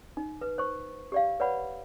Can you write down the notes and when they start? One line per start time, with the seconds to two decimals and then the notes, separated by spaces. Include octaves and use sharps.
0.17 D#4
0.41 B4
0.58 C5 C#6
1.12 G4 D5 F5
1.40 B4 C#5 D5 F#5 B5